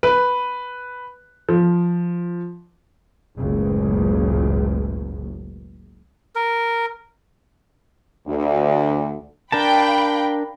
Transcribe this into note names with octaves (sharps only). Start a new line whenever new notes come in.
B4
F3
F#1 C#2 A2
A#4
D2
D4 A#4 F5 G5 A5 B5